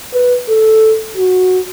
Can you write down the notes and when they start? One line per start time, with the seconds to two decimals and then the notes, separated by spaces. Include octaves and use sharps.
0.14 B4
0.49 A4
1.17 F#4